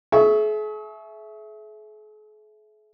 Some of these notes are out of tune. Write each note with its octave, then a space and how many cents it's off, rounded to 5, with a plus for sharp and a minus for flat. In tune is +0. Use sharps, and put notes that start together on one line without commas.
G#4 +45 E5 +0 C#6 +0